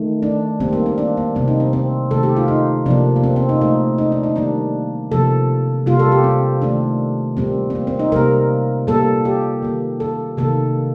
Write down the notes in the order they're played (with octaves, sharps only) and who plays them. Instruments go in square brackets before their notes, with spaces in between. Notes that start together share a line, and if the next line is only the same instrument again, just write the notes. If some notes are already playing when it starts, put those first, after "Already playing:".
Already playing: [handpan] D#3 A3
D4
D#3 G3 A#3 C4
A#3
C4
D4
A#3
C3 G3 A#3 C4
D#4
C4
C4
C3 D#3 A3 A4
G4
F4
D#4
C3 F3 A#3 D4
A#3
C4
C4
D#4
A#2 A3 D#4
D#4
D4
D#4
D#3 G3 A#3 D4
C3 F3 A#3 A4
C3 G3 A#3 F4
A4
G4
C4
D#3 A3 D4
A#2 G3 A#3 C4
C4
A#3
C4
D#4
C3 G3 A#3 A#4
A#2 G3 A#3 A4
G4
D#3 A#3
A4
C3 D#3 A#3 A4